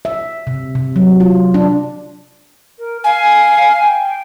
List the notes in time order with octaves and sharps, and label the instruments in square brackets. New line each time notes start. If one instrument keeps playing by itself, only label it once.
[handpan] E5
C3
C3
F#3
F4
D4
[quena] A#4
[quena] F5 [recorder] G#5
[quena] G5